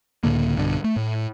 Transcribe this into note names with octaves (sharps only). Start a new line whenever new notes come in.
C#2 A2 D3 A#3
B1 G2 B2 D3
A3
A2